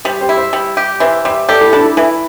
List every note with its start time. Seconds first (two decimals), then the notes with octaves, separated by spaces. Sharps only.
0.05 G3 G4 C5
0.21 G4 C5
0.29 E4
0.37 C5 E5
0.53 G3
0.77 G4
1.00 E3 C5 E5
1.25 G3 C5 E5
1.49 G4 A4 D5
1.61 E4 A4
1.73 D4 E4 A4
1.85 E4
1.97 E3 E4